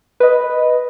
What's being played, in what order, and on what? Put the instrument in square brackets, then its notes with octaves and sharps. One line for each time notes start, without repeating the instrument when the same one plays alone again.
[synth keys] B4 D#5